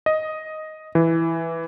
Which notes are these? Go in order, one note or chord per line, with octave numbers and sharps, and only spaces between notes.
D#5
E3